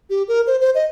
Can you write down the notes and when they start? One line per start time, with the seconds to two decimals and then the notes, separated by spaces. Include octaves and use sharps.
0.10 G4
0.28 A#4
0.47 C5
0.61 C5
0.75 D#5